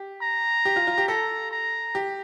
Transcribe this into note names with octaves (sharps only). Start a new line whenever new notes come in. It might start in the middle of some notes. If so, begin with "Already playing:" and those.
Already playing: G4
A#5
G4
F4
F4
G4
A4 A#5
A#5
G4